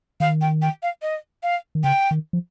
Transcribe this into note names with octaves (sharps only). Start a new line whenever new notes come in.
D#3 F5
G5
G5
F5
D#5
F5
D#3
C#3 G5
D#3
F3